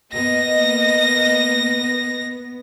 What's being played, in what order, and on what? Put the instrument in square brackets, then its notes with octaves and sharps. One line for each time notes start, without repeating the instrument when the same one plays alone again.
[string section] A#3 D#5 [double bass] B3 [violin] A#6